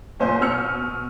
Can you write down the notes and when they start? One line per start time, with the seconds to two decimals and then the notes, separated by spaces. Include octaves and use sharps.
0.20 F#1 A#2 C5 G#5 G6
0.41 B2 E6 F6 C#7